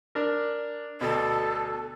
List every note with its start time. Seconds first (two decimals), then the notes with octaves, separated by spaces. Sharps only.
0.15 D4 A#4
1.01 D2 B2 A4